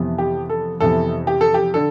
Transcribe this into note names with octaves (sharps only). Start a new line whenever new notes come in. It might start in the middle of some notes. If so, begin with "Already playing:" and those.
Already playing: F2 C3 E3 B3
G4
A4
F2 C3 E3 B3 A4
G4
A4
G4
D3 A4